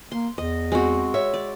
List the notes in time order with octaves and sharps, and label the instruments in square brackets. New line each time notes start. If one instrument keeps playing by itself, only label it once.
[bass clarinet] A#3 [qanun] C6
[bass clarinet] E2 [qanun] D#5
[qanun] G#3 F#4 [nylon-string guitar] C4
[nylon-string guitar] C#5 E5
[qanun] D5